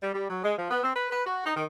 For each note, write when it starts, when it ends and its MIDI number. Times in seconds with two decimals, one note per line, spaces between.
0.02 0.12 55
0.13 0.27 55
0.29 0.39 54
0.43 0.53 56
0.57 0.66 53
0.70 0.79 59
0.83 0.94 60
0.95 1.08 71
1.09 1.22 71
1.25 1.44 66
1.44 1.51 63
1.55 1.63 51